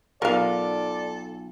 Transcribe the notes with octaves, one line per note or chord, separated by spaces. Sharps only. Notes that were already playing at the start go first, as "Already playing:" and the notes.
B1 F4 A4 A#4 D5 F5